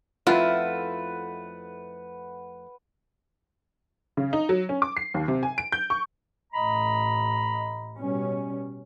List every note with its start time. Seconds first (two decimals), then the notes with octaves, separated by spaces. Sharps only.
0.27 F2 A3 E4 F4 B4 F#5
4.17 C#3
4.33 D#4
4.49 F#3
4.69 C#4
4.82 D6
4.97 C7
5.14 D#2
5.28 C3
5.43 G#5
5.58 D7
5.72 G6
5.90 C#6
6.53 A1 A2 D#5 A#5 B5
7.98 B2 G3 C#4